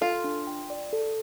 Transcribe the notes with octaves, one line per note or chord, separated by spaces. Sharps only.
F4 A4
D4
G5
D5
A4